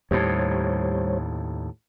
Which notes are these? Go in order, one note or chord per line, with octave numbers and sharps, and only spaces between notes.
D#2 A2 G3 C5 C#5